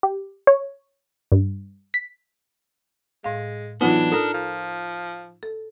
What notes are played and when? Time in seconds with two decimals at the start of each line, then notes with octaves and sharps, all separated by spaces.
0.03 G4
0.47 C#5
1.32 G2
1.94 B6
3.24 A2 G#3 F5
3.81 E3 F#3 B3 D4 D#4 F4
4.12 A4 A#4 D#6 F6
4.34 F3
5.43 A4